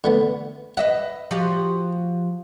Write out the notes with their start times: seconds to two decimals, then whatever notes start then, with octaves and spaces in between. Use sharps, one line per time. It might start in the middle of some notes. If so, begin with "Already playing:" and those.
0.04 D3 A3 B3
0.77 B4 D#5 E5 F#5
1.31 F3 F#4 G4